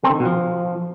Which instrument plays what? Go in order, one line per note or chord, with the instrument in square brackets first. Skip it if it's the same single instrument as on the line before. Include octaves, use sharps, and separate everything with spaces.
[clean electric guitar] C4
D3
D#3
B2
F3